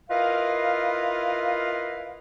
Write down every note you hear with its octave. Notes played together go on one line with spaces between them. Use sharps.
E4 F4 A#4 B4 D#5 F5